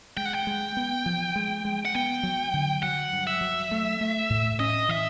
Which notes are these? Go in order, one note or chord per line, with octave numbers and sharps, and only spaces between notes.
G#3 G5
F#5
G5
G#3
B3
F3
G#3
G#3
F#5
B3 G5
F#3
D3
F#3 F#5
G2
E5
F#3
A3
A3
A2
C#4 D#5
E3 E5